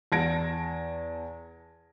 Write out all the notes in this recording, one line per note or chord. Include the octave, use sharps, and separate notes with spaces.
E2 A5 G#6 A#6 D7